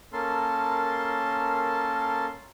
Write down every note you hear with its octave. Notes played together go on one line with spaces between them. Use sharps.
A#3 C#4 A4 A#4 A5 C6